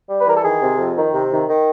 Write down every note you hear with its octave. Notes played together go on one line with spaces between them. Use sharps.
G3
B4
E3 A#4
A4
D#3 G#4
C3
F2
D#3
C3
D#3
D#3